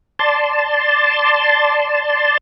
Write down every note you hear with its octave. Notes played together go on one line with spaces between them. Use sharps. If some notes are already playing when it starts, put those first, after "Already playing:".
D5 A5 C6